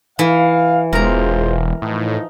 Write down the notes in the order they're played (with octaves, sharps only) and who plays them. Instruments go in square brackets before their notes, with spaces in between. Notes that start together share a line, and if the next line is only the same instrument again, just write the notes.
[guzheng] E3 [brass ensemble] F5
[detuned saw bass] E1 [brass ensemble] G#3 F4 C5 [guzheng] A#4 A#5
[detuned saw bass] A2 [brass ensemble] E3 F3 D#4